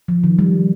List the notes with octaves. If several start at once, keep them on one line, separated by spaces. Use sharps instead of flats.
F3
D#3
G3